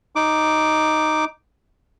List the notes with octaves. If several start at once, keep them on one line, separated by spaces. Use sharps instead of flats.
D#4 D6